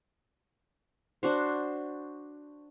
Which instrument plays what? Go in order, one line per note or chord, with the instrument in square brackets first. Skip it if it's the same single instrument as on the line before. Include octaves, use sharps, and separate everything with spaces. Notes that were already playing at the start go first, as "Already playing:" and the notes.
[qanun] D4 F#4 C5